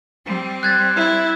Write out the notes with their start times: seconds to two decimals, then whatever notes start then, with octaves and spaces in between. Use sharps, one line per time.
0.25 G3 C4
0.63 F#6 G#6 A6
0.96 E4